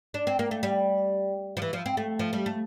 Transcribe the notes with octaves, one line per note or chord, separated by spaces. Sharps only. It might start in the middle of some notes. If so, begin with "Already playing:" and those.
D4
C4
A#3
A3
G3
F3
E3
F3
C4
A3
F3
G3
A3